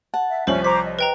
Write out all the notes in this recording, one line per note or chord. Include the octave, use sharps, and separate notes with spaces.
F#5 A5
E5
C2 F3 C#4 C5 D5 E5 F#7
C5 C#5 A#5 D6 B6
D#5
B4 G5 A#5